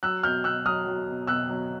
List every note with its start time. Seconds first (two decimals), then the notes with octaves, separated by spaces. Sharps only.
0.03 F#3 E6 F#6
0.23 B2 F6 G6
0.44 B2 E6 F#6
0.65 F#3 D#6 F6
0.87 F#3
1.07 B2
1.27 B2 E6 F#6
1.49 F#3